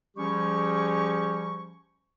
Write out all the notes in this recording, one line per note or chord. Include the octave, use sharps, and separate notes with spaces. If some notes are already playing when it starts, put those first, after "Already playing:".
F3 G3 C#4 G4 G#4 C#6